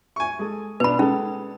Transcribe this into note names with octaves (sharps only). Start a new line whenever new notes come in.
G#5 C#6
G#3 A4
B2 D4 B4 B5
G#3 C#4 A4